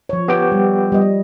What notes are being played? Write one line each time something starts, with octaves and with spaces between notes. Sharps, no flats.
F3 C#5
B3 G4 G5
G3
G3 D#5